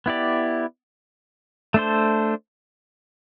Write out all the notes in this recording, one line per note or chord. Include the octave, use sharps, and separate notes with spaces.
B3 E4 G4 D5
A3 D4 A4 C5